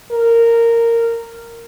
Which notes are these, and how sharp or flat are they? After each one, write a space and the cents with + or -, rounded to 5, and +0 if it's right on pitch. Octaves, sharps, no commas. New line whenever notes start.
A#4 -10